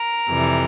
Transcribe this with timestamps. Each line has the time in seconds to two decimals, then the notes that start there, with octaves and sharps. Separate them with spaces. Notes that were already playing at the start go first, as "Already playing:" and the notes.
Already playing: A#4
0.28 F2 C3 E3 G3